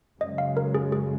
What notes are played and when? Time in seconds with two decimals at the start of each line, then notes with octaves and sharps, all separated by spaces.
0.21 F#2 C#3 G#3 D#5
0.38 F5
0.57 A#4
0.75 G#4
0.92 G#4